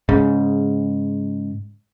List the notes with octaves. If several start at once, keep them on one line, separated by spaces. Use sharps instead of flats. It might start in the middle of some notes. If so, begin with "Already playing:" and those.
G#2 C#3